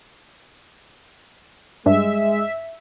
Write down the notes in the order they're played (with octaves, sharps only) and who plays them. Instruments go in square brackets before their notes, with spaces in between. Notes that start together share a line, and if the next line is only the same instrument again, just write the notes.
[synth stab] G2 [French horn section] G#3 [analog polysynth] E5